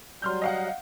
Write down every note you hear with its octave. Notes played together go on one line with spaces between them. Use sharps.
F#3 G3 C6 F6 G6
D#5 F5 F#5